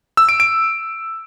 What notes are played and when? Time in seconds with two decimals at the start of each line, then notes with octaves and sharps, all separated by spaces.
0.17 E6
0.29 D7
0.40 D7